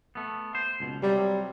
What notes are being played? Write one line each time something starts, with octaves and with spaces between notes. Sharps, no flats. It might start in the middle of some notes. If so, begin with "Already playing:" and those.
A3 B3
C5
C#2 B2
C3 F#3 G3